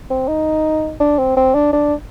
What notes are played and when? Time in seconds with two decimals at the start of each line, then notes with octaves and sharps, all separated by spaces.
0.10 C4
0.28 D#4
1.00 D4
1.19 C4
1.37 C4
1.54 D4
1.73 D4